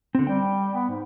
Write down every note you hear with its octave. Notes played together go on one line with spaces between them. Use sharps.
D3 C4
G3 G5
B3
G#2